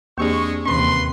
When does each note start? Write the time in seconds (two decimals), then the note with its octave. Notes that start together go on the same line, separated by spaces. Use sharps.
0.18 E2 G#3 A#3 C4 D4 G4 G#4 C#6
0.66 D#2 C3 E3 C#4 B4 C6